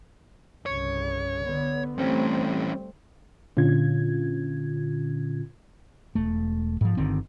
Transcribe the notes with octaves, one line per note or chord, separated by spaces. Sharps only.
C2 G2 C#3 C#5
D3 B3
E3 G3 A3 C4 C#4
A#2 D3 C#4 F4 G#6
E1 A3
G#2 F3
G1 D3 D#3 C4